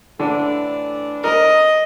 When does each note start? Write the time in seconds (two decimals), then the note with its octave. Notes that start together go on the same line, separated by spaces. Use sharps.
0.19 A2 D3 E3 D4
1.24 A#4 D#5